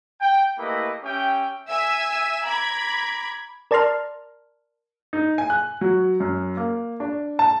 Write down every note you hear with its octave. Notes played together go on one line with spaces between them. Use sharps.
G5
A3 A#3 E4 G4 B4 D#5
C#4 G4 E5 G5
E5 G#5 E6
A#5 B5 D6 G#6
A#4 D5 A5 A#5 C6 F6
D#4
G#5
F#6
F#3
F#2
A#3
D4
A5